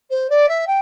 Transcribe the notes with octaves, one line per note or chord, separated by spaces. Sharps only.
C5
D5
E5
G5